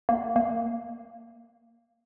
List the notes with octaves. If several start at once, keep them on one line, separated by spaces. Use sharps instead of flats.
A#3
A#3